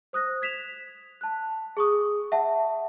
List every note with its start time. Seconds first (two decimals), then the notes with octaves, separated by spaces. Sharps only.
0.13 C5 D#6 F#6 A#6
0.42 G#6 B6 E7 F7
1.21 A5 F#6
1.77 G#4 C#6 D#6
2.32 E5 F#5 A5